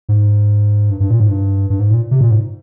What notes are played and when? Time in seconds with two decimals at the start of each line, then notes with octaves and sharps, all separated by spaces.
0.09 G#2
0.90 G2
1.00 G2
1.10 A#2
1.20 G#2
1.29 G2
1.70 G2
1.80 G#2
1.91 A#2
2.11 C3
2.21 A#2
2.31 G#2